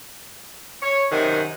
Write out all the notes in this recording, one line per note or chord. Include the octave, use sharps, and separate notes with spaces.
C#5
F#2 C3 D#3 F#5 G#5